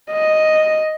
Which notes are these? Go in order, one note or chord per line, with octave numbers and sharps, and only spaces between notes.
D#5